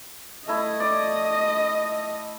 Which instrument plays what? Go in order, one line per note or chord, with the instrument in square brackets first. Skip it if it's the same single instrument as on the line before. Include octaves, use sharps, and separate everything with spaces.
[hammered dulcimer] A3 E4 [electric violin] D#5
[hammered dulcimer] D5